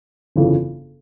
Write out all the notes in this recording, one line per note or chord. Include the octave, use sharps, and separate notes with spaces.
G1 F2 C#3 E3